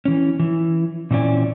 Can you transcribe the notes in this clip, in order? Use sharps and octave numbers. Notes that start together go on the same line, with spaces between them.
E3 C#4
E3
A#2 E3 C4 C#4 D5 G#5